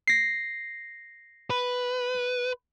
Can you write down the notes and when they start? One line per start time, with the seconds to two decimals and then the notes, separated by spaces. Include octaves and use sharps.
0.08 A#6 C7
1.50 B4